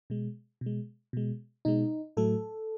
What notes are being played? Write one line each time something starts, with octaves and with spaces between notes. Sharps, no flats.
B2 G#3
B2
G#3
B2 G#3
B2 G#3 D#4
A2 F#3 A3 A4